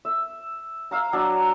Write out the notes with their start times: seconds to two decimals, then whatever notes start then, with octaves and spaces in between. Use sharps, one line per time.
0.05 E5
0.91 E5 F5 A#5
1.13 F#3 D4